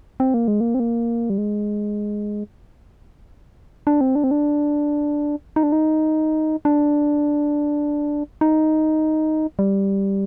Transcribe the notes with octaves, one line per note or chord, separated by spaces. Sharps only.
C4
A#3
G#3
A#3
C4
A#3
G3
G#3
D4
C4
D4
C4
D4
D#4
D4
D#4
D4
D#4
G3